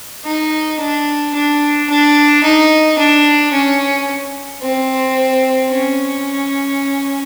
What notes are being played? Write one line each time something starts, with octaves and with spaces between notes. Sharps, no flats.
D#4
D4
D4
D4
D#4
D4
C#4
C4
C#4